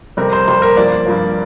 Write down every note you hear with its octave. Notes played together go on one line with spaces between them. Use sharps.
F2 C3 G3 C4 A#4
C5
F2 C3 G3 C4 C5
A#4
G2 F3 A#3 D5
G2 F3 A#3